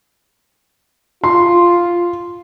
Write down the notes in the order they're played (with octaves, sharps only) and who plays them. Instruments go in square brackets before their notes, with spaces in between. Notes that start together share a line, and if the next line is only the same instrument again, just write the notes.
[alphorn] F4 [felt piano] C6